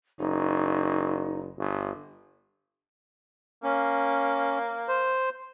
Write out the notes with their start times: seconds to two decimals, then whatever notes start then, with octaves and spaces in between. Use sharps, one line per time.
0.19 F#1 D#4
1.58 G1
3.63 A#3 C#4
4.88 C5